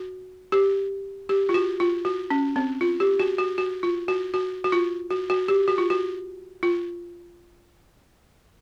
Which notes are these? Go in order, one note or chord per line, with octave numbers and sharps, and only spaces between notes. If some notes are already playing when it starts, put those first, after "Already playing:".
Already playing: F#4
G4
G4
F4
F#4
F4
F#4
C#4
C4
F4
G4
F#4
F#4
F#4
F4
F#4
F#4
F#4
F4
F#4
F#4
G4
F#4
F4
F#4
F4